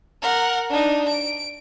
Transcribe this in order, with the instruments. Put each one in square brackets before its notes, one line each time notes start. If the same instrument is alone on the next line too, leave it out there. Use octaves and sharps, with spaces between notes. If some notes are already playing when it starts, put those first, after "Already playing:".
[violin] A#4 F#5
D4 D#4
D7